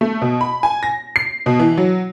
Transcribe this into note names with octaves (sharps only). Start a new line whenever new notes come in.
A3
B2
B5
G#5
A#6
C7
B2
E3
F#3